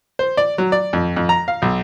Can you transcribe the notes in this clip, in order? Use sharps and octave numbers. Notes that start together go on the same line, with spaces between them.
C5
D5
F#3
D5
F2
F2
A#5
F5
B1